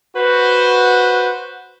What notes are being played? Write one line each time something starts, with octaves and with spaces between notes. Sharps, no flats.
F#4 B4 C5